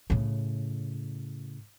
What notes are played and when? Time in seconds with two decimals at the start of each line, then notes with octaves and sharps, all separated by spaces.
0.10 A2 C#3